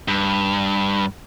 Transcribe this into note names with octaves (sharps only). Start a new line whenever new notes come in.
G2